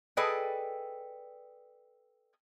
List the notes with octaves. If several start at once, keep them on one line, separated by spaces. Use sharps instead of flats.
G#4 A4 B4 D5 D#5 G5